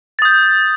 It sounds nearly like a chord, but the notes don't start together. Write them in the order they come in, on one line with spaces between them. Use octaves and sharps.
A6 D#6 G6